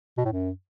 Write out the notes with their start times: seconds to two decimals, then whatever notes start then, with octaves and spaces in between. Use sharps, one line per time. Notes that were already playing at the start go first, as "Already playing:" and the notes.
0.18 B2
0.25 A2
0.33 F#2